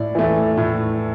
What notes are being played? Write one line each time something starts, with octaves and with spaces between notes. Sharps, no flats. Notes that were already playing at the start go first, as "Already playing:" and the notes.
Already playing: A2 D5
E3 A3
A2